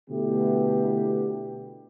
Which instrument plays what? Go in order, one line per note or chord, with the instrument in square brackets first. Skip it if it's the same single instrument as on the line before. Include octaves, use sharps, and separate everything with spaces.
[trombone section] B2 D3 A3 B3 E4 G4